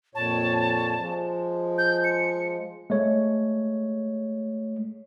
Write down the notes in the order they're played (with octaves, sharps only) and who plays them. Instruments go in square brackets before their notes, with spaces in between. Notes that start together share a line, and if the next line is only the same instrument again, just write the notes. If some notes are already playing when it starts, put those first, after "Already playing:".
[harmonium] F2 A#2 C#5 [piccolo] A5
[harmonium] F3 G#3
[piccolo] G6
C#7
[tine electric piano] G#3 A3 C#5